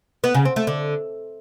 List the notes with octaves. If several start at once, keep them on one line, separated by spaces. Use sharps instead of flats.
B3
C#3
C4
A3
D3